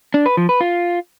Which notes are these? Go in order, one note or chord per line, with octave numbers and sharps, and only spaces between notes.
D4
B4
F3
B4
F4